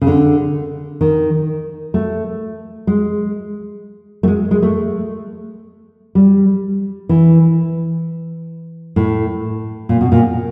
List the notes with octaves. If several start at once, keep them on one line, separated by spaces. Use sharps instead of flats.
C#3
D3
D#3
A3
G#3
A3
G#3
G#3
A3
G3
E3
A2
A#2
B2
A#2